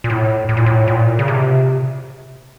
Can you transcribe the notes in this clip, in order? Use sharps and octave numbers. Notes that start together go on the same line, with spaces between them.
A#2
A2
A2
A#2
A2
A#2
C#3
C3